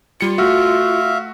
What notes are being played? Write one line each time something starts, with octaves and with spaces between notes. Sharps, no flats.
G3 F4 C#7
A3 F#4 E5 F5